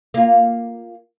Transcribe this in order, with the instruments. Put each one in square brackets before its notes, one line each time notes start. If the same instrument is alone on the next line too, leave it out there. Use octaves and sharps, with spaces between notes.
[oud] A#3 F4